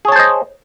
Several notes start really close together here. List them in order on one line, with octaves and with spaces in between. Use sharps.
G#4 C#5 A5 C5 D#5